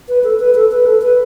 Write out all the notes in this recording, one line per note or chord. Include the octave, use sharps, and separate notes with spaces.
B4
A4
B4
A4
B4
A4
B4